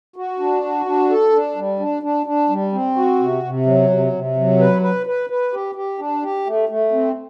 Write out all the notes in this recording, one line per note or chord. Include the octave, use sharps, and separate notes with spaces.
F#4
D4
F#4
D4
A4
D4
G3
D4
D4
D4
G3
C4
F#4
C3
C3
F#3
C3
C3
F#3
B4
B4
B4
B4
G4
G4
D4
G4
A3
A3
C4